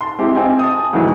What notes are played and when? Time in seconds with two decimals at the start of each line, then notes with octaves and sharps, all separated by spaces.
0.01 A5 C6
0.18 G#3 C4 E4 G4
0.35 C4 F4 D#5 G5 G#5
0.59 A5 D#6
0.93 D2 G#2 D#3 E3 F#3